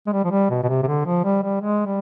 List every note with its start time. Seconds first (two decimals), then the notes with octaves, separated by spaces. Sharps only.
0.07 G#3
0.12 G3
0.24 F3
0.31 G3
0.50 B2
0.63 B2
0.68 C3
0.83 C3
0.87 D3
1.06 F3
1.24 G3
1.43 G3
1.61 G#3
1.86 G3